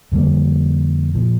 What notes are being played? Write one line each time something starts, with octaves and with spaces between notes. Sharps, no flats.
F2 D3 G3 A#3
A#2 F3